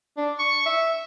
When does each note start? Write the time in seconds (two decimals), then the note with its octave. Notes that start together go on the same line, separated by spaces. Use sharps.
0.17 D4
0.39 C#6
0.66 E5